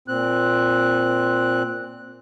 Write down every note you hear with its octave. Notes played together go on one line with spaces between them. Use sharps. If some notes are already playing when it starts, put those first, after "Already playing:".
A#2 C4 F#6